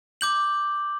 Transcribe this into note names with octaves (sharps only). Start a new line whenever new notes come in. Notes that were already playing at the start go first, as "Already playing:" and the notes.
D6 G6 F#7